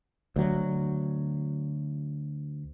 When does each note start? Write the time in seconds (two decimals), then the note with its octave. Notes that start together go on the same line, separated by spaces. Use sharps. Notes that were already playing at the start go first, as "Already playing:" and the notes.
0.36 D2 F#3